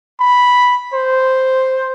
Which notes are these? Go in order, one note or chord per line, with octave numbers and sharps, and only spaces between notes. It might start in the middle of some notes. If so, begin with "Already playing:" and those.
B5
C5